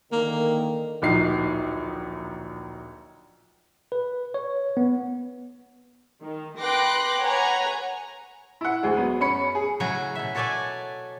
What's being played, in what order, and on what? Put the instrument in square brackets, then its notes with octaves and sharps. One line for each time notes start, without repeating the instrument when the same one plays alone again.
[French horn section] D3 D#3 [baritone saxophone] A#3
[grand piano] D1 A#1 D#4 C7
[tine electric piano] B4
C#5
B3
[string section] D#3
B4 G5 C6 D6 F#6 A#6
B4 C#5 F#5 G#5 A#5
[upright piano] E4 F#5
D2 G#3
F#3 B3
F#2 C#4 B5 C#7
G#4
[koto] A2 C#3 F#3 F#5 G#5 A#5
B2 E5
F#4 A4 C#5 D5 E5 G#5